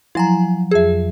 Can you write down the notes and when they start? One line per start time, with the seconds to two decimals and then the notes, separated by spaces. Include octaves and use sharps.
0.15 F3 F#3 E4 G#5 A#5
0.71 F2 G#4 E5 G#6